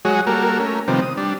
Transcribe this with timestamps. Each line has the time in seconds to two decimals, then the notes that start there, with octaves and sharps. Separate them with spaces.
0.05 F#3 G#3 F#4 G#4 C#5
0.27 G3 A#3 F#4 A4 A#4
0.59 A3 C#4 A#4
0.88 C3 D#3 F3 G3 B3 C4
1.02 D#6
1.17 G3 D4